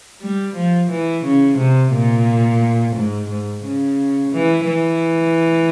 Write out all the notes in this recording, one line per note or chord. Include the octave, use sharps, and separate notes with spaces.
G3
F3
E3
C#3
C3
A#2
G#2
G#2
C#3
E3
E3